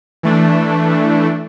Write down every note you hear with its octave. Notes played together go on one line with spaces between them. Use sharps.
E3 A3 D4